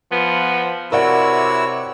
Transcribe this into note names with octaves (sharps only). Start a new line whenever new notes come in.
F3 B3
C3 E4 F#4 A#4 C#5 D5 F#5 E6